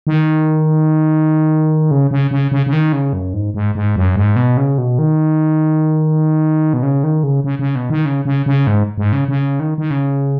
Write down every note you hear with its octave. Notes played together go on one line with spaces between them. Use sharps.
D#3
C#3
C#3
C#3
C#3
C#3
D#3
C#3
F#2
G#2
G#2
G#2
F#2
G#2
B2
C#3
B2
D#3
B2
C#3
D#3
C#3
C#3
C#3
B2
D#3
C#3
C#3
C#3
G#2
G#2
C#3
C#3
D#3
D#3
C#3